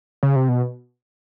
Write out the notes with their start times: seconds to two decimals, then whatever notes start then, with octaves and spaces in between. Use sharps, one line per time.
0.23 C#3
0.36 C3
0.49 B2